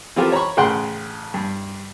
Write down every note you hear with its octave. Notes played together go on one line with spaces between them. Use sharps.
E3 C4 F4 G4 A4 A#4
C#5 A#5 B5 C#6
A1 C#3 G#4 F#5 G5 C6
G2